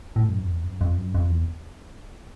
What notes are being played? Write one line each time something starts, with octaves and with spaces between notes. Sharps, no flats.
A2
F#2
F2
E2
F#2
F2
F#2
F2
E2